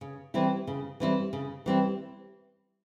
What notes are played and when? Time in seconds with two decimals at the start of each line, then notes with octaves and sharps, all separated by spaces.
0.01 C#3
0.34 E3 G3 C4 E4
0.67 C#3
1.00 E3 G3 C4 E4
1.33 C#3
1.66 E3 G3 C4 E4